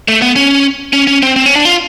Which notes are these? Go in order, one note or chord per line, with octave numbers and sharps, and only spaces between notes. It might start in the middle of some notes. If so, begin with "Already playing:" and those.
A3
B3
C#4
C#4
C#4
C4
C4
C#4
D4
F4